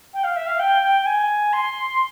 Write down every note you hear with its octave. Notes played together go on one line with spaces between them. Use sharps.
G5
F5
E5
F5
G5
G5
G5
G#5
C6